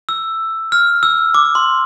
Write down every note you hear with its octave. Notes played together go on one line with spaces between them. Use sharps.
E6
F6
E6
D6
C6